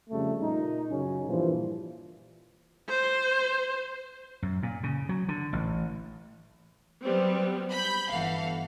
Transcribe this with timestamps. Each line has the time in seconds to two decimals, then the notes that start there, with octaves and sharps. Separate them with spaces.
0.10 F2 C#3 G3 A3
0.42 A#2 D#4
0.91 F#2 C#3 C#4
1.28 G2 A#2 E3 F3
2.88 C5
4.42 F#2
4.63 A#2
4.83 C#3
5.09 F#3
5.28 D3
5.53 A1
7.03 F#3 G3 B3 C4
7.70 B5 G6
8.10 G1 E3 A4 F5 F#5